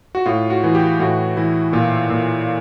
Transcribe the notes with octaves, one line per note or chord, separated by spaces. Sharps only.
F#4
A2 F4
F#4
E3
G4
A2 F#4
E3 E4
A#2 F4
A#2